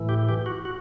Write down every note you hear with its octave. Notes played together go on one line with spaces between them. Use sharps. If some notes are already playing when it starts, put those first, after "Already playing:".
Already playing: A2 E3
G4
G4
F#4
F#4